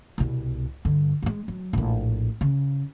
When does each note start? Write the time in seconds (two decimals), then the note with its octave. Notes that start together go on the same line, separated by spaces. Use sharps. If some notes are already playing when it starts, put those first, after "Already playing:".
0.18 C2 B2
0.85 G2 D3
1.22 G2 G#3
1.48 F#3
1.73 A#1 A2
2.41 C#3